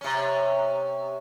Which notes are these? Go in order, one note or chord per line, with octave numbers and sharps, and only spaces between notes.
C3 C#4